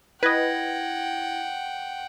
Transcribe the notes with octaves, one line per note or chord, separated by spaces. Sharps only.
E4 B4 D#5 F#5 G5 G#6 A#6